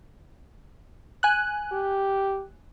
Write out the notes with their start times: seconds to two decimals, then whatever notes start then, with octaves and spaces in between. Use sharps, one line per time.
1.23 G#5 F#6
1.72 G4